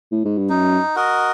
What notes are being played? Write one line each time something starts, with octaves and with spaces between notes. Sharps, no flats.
A2
G#2
G2
F#2 D#4
F#4 A#4 D#5